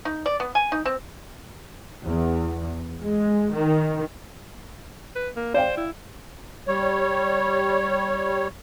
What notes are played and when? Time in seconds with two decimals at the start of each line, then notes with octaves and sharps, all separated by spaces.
0.05 D#4
0.26 D5
0.40 B3
0.55 G#5
0.72 D#4
0.85 C4
2.04 E2
3.01 G#3
3.55 D#3
5.16 B4
5.36 A#3
5.54 C5 D5 F5 G5
5.77 E4
6.67 G3 C#5